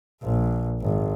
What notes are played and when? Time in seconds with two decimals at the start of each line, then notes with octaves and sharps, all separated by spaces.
0.23 A#1
0.81 G#1